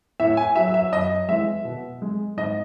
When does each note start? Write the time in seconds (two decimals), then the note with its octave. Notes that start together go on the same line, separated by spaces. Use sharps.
0.20 A2 E5
0.37 G#5
0.56 F#3 E5
0.74 E5
0.92 F#2 D#5
1.29 E3 G#3 E5
1.65 B2
2.02 G#3
2.37 G#2 D#5